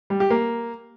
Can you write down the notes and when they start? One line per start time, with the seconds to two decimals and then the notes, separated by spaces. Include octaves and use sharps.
0.10 G3
0.20 G4
0.30 A#3